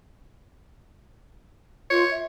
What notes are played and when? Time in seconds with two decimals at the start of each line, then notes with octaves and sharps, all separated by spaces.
1.90 F4 C#5
2.11 E5